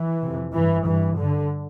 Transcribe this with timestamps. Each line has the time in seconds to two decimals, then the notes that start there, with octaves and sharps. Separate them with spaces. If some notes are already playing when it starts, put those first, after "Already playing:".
Already playing: E3
0.22 F2 C3
0.54 G2 E3
0.86 G2 E3
1.18 G2 D3